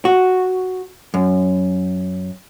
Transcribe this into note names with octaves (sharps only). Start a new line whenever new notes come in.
F#4
F#2